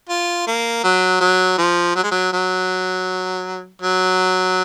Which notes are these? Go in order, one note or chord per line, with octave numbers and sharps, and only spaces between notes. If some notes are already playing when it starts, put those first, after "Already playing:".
F4
A#3
F#3
F#3
F3
F#3
G#3
F#3
F#3
F#3